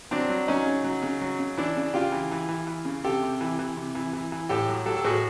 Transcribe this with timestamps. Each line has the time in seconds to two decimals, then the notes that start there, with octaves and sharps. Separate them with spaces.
0.11 F#3 C4 D4
0.29 F#3
0.48 F#3 C#4 D#4
0.66 C#3
0.84 F#3
1.03 C#3
1.21 F#3
1.39 C#3
1.57 E3 D4 E4
1.77 C#3
1.94 C#3 F4 G4
2.12 E3
2.31 E3
2.49 E3
2.67 E3
2.85 C#3
3.04 C3 G4 A4
3.23 C3
3.41 E3
3.59 E3
3.76 C3
3.95 E3
4.13 E3
4.32 E3
4.49 A2 G4 A4
4.69 F#3
4.86 F#3 G4 A4
4.97 A4
5.04 A2 F#4 G#4